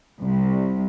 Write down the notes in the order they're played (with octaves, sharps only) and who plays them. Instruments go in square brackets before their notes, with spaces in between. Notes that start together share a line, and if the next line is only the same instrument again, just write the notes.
[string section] C2